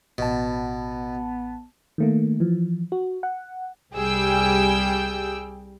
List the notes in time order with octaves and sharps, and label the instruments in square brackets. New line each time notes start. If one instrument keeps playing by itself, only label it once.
[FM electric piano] A1 A5 [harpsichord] B2 [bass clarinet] B3
[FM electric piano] D#3 A3 A#3
E3 F3
F#4
F#5
[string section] C2 G3 G#4 G5 E6